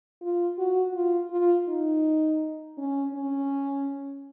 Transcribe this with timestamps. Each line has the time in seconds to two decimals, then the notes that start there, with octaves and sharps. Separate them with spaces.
0.22 F4
0.58 F#4
0.94 F4
1.31 F4
1.68 D#4
2.78 C#4
3.14 C#4